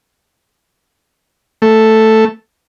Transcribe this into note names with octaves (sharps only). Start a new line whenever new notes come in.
A3